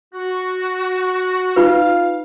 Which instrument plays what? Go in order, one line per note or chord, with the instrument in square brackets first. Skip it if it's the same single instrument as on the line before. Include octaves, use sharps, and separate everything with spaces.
[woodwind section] F#4
[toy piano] D#4 F4 B4 [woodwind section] F5